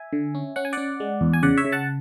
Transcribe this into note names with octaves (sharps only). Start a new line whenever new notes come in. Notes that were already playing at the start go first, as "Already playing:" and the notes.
Already playing: E5 G#5
D3
C#4
C#4 F#5
G#5
C#4 D5 F#5
G#3
E2
G#5
C#3 D5 F#5
C#5 E5
C#3
F#5 A5